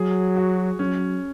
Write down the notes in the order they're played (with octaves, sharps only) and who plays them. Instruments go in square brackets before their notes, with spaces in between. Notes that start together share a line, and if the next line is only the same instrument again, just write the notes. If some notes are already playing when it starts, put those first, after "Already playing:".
Already playing: [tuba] F#3 [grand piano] G#4
[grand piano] F#4
[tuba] F#3 [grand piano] C#4